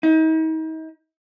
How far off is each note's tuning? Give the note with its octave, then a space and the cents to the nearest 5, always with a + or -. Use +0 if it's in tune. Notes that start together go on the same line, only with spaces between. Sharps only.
D#4 +40